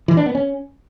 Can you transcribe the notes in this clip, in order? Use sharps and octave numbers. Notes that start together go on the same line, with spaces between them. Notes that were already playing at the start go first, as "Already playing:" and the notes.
E3
D4
B3
C#4